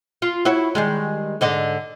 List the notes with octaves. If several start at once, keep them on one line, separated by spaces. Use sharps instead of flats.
F4
E4 F#4 C#5
D#3 G3 G#3
G#2 D3 D#5